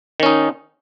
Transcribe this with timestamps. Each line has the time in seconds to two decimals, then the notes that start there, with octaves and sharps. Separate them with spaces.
0.20 D#3
0.23 C#4
0.26 D#4